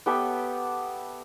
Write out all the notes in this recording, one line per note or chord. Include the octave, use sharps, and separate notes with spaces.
B3 G4 A4 E5